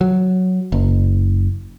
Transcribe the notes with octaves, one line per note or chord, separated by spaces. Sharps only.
F#3
F#1